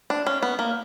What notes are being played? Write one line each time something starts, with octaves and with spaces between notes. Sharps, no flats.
D4
C#4
B3
A#3